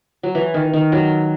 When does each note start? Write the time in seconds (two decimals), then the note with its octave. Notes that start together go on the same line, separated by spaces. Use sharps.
0.23 F#3
0.35 E3
0.54 D#3
0.73 D#3
0.92 F#3